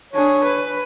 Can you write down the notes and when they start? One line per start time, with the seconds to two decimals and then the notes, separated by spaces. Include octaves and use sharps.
0.13 D4 G#4 C#5
0.44 B4